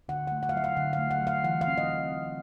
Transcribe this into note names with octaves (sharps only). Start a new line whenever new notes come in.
D3 F#5
A3 F#5
F#5
F5
F#3 E5
F5
D3 F#5
F5
A3
F#5
F#3 F5
E3 F#5
F5
C4
D#5